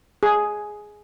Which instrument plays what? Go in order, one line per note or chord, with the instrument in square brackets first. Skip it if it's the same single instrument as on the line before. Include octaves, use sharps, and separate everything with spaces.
[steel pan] G#4